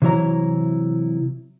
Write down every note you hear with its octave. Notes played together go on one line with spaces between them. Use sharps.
C3 E3 F#3 E4 C#5 A#5